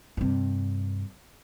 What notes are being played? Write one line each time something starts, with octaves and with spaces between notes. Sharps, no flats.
G2 C3